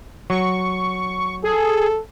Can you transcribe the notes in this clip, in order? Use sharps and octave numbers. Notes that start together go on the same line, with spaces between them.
F#3 C#6
G#4 A4